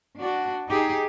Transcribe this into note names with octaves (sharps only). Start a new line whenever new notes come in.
D4 F#4
D#4 G4 G#4